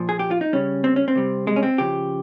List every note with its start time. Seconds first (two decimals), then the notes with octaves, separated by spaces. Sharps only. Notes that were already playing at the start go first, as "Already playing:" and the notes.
Already playing: A#2 F3
0.09 G#4
0.19 G4
0.31 F4
0.41 D#4
0.53 C#3 G3 C#4
0.84 C4
0.96 C#4
1.08 C4
1.15 C3 G3
1.47 G#3
1.56 C#4
1.63 C4
1.78 C#3 F3 G4